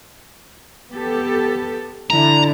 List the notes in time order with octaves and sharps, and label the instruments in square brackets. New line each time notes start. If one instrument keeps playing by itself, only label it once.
[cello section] B3 G4 A4
[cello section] D3 D4 E4 [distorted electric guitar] A#5